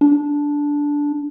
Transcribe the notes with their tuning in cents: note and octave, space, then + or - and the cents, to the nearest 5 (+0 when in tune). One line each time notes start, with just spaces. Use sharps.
D4 -10